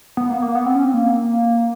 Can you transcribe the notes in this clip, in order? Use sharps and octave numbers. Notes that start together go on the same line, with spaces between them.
B3
A#3
B3
A#3
B3
C4
C#4
C4
A#3